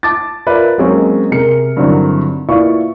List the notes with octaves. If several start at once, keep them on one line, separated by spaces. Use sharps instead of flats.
A5 D6 A6
F4 A#4 B4 D5 E5
F#3 G#3 A#3 C4 C#4 D#4
C3 G#4 A#4 C#7
G2 D3 D#3 F#3 C4 E4
A#2 E4 B4 D5 F5 C#6